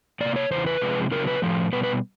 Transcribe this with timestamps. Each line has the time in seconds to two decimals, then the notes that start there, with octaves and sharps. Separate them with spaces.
0.21 C3 F3 A#3 D5
0.36 C#5
0.51 E2 C#3 E3 C5
0.67 B4
0.81 C3 F3 G#3
1.11 C#3 F#3 B3 D4 A#4
1.27 B4
1.42 A2 F3 A3
1.73 B2 G3 B3 B4
1.83 B4